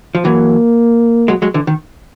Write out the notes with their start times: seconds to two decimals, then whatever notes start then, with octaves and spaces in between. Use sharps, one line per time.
0.15 F3
0.25 E3 F#3 A#3
1.28 F#3 G#3
1.42 F#3 G#3
1.54 D3 E3
1.67 D#3